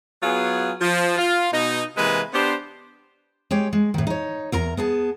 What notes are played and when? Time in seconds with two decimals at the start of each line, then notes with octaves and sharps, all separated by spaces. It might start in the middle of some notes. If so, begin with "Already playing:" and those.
0.23 F#3 B3 F4 G#4
0.82 F3
1.18 F4
1.53 B2 D#4
1.97 C3 E3 G#3 A#3 B4
2.33 B3 D4 G4 C5
3.51 G#3 G4 C#5 G5
3.73 G#3
3.94 A2 D#3
4.07 D#4 C#5
4.52 E2 A#4 A#5
4.77 B3 G#4 A5